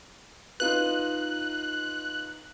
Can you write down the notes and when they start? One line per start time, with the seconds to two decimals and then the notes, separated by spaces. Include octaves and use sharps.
0.60 D#4 F4 B4 F#6